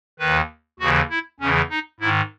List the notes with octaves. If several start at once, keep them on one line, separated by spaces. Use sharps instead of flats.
D#2 D#3 B4
D#2 C#3 E3 F#4
E4
E2 C#3 E3 C#4
D#4
G#2 D#3 E4